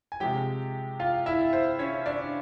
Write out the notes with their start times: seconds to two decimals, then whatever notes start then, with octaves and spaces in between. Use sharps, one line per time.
0.12 G#5
0.20 C3 F3 G#3 G4 G5
1.00 F4 F5
1.26 E4 E5
1.53 C5
1.79 C#4 C#5
2.06 D4 D5